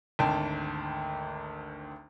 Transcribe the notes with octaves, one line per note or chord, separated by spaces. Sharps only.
G#1 D2 G5 A5